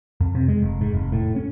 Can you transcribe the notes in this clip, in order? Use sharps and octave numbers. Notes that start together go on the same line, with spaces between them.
F2
C3
G#3
F1
G#2
F1
A2
C#4